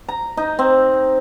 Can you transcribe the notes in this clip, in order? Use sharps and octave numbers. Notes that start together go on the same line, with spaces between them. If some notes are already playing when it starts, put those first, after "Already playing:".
A#5
D#4
C4